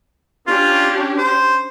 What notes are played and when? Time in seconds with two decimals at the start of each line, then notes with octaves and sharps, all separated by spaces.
0.47 C#4 D4 F4 G4
1.18 C5